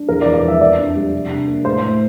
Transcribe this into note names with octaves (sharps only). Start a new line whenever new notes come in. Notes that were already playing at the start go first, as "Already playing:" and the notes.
Already playing: D4
E2 A#4
D5
E2
D5
F3 E5
F2 D5
D4
G3
C3
D4
A#3
A2 C5
A2